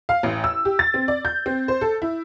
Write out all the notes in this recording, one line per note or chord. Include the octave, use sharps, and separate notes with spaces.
F5
A1
E6
G4
A6
C4
D5
G6
C4
C5
A4
E4